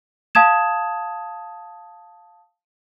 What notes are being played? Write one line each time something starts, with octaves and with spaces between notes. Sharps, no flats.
F5 A5 D#6 G#6 E7